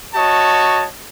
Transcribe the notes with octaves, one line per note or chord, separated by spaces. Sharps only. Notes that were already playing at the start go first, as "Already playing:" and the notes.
F#4 C#5 D#5 A5